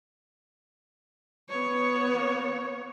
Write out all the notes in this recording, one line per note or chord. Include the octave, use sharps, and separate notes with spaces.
B3 C#5